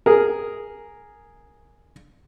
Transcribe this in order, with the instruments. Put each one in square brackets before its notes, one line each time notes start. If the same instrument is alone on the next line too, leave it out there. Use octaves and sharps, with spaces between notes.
[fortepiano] G#4 A#4